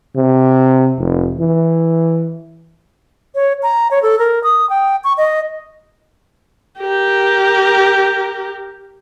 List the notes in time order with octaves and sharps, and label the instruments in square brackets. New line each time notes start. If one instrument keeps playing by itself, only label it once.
[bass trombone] C3
F1
E3
[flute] C#5
A#5
C#5
A4
A#4
D#6
G5
C#6
D#5
[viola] G4 A#4